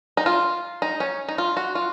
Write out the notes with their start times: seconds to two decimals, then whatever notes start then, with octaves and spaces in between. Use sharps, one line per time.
0.17 D#4
0.26 F4
0.82 D#4
1.00 C#4
1.29 D#4
1.38 F4
1.57 F#4
1.75 F4